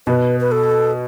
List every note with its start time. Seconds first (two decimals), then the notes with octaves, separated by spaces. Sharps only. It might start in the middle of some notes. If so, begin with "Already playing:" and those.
0.07 B2 B4
0.40 B4
0.52 A4